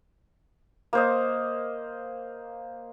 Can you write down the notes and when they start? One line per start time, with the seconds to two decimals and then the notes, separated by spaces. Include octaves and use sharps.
0.93 A#3 C5 D#5